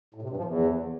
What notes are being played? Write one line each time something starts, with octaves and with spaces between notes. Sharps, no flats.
A2
C3
G2
F3
E2